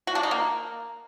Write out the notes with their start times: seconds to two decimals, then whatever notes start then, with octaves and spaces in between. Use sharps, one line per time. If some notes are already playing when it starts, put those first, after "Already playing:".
0.07 F#4
0.15 D4
0.23 D#4
0.31 A#3